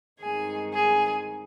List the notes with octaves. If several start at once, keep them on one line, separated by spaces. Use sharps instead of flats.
G2 D#3 G#3 C4 D#4 G#4 G#5
G#4 G#5